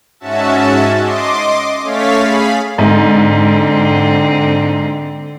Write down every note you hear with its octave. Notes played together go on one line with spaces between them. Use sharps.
G#2 C#4 F#4 E5 A5
D#5 C6 D6
A3 C#4 C#5 F5 A6 B6
G#4 F5 B5
G#2 D3 C4